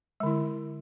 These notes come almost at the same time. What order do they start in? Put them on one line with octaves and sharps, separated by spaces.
G#3 D3 E4